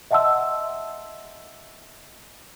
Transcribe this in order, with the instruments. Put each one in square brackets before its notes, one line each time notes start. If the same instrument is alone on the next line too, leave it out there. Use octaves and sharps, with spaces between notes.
[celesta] D#5 E5 F#5 A5 C6 E6